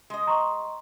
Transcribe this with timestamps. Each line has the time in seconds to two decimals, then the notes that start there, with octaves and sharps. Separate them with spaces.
0.10 G#3 D#5
0.27 A#5 C6 C#6